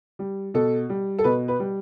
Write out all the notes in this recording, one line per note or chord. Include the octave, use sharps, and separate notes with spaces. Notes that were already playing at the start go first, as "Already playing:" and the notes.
G3
B2 A4
G3
A4
B2 B4
B4
G3